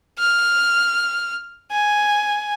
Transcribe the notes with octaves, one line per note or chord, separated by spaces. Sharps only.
F6
G#5